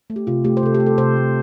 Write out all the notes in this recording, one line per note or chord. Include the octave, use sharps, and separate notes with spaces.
A3
G4
C3 F4
A3 G4
C5
C3 A4
G4
A3
A4
C3 C5
A3